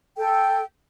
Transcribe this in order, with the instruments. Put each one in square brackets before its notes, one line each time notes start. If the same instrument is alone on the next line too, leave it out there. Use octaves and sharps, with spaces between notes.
[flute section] A4 G5